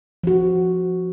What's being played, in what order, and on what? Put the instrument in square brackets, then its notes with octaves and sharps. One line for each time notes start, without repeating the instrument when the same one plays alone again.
[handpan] F3 F#4